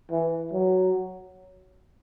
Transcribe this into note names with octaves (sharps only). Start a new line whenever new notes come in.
E3
F#3